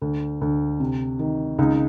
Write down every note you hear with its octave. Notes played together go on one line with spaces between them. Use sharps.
D2
D2
C3
D#3
C#2 D#4